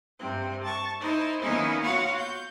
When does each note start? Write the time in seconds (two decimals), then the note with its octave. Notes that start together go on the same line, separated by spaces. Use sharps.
0.19 G2 C3 C4
0.64 A5 C#6
1.00 D#4 E4 C5
1.40 D#3 A#3 B3 C#4 D#4 E4
1.83 F4 F#4 C#5 F5 F#5 C#6
2.17 G6